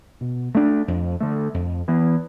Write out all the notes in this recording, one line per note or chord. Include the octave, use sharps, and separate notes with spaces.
B2
A3 D4
F2
D3 A3
F2
E3 B3